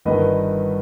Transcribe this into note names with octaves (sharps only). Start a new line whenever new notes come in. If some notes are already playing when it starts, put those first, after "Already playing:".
G1 G2 D#3 B4 D#5